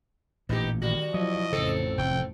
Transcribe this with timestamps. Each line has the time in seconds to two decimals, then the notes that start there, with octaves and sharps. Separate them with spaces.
0.49 A1 A#2 B3 D#4 G4
0.82 D#3 G3 F#4
1.14 F3 F#3 E4 D#5
1.53 A1 F2 C#3 C4 A4
1.98 F1 G5